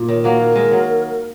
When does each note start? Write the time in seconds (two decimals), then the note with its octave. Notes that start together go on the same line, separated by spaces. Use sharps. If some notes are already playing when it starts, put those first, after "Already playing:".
Already playing: A#2
0.08 D#3 C#5
0.24 F#3 A#3 A#4
0.40 F#3
0.55 D#3 G#3
0.71 F#3